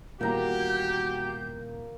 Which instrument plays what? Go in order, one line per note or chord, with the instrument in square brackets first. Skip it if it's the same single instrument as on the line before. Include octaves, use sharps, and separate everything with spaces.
[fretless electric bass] D#1 E2 A#2 [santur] A#3 A#5 [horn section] F#4 G4 [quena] G6